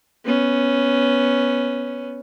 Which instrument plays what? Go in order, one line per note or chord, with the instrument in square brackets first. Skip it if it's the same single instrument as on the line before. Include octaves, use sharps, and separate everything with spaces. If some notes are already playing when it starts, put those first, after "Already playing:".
[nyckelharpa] B3 C#4